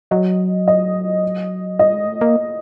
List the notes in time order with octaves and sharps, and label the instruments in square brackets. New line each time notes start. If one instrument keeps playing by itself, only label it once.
[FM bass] F#3 [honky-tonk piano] D#5
[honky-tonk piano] D#5
[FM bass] G3 [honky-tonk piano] D#5
[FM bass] G#3
A3
A#3